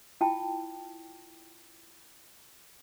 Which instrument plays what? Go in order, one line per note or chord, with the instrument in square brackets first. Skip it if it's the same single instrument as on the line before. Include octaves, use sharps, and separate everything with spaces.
[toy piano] E4 F4 G5 A5